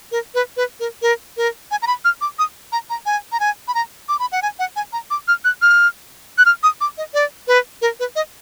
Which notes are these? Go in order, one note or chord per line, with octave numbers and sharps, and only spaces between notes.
A#4
B4
B4
A#4
A#4
A#4
G#5
A#5
B5
F6
D6
D#6
A#5
A#5
G#5
A#5
G#5
B5
A#5
D6
B5
F#5
G#5
F#5
G#5
A#5
D6
F6
F#6
F6
F#6
F6
D#6
D6
D#5
D5
B4
A#4
B4
D#5